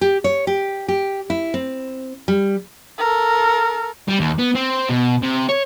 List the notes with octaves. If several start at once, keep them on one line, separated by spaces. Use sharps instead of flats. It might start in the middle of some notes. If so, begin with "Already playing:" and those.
G4
C#5
G4
G4
E4
C4
G3
A4 A#4
G3
D#2
B3
C4
B2
C3
C#5